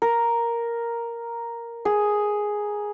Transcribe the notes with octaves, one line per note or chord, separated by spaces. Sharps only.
A#4
G#4